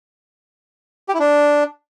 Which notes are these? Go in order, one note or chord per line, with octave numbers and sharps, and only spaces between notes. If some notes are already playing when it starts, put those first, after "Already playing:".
G4
E4
D4